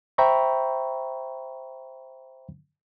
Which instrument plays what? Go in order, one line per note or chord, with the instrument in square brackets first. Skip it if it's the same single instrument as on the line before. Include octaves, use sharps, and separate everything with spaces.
[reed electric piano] C5 E5 G5 A#5 B5 C#6